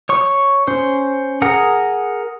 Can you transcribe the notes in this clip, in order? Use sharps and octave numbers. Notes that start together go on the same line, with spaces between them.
C#5 C#6
C#4 C5
G#4 A#4 F#5